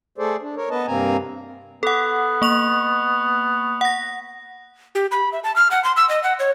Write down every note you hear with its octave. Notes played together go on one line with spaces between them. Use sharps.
A3 G#4 A4 C5 D5
D4
A#4 C#5
B3 B4 D#5 A5
G2 C3 A#3 C4 G#5 A#5
B3 A4 F#5
A#3 C#6 F7
F#5 A#6
G4
B5
E5
A5
F6
F#5
C6
E6
D#5
F#5
C#5